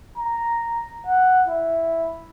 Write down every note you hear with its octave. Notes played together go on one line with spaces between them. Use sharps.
A#5
F#5
E4